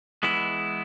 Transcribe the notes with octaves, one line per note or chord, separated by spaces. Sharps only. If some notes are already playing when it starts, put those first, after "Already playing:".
E3 G#3 B3 E4